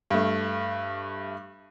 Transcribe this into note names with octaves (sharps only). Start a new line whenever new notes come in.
G2 A3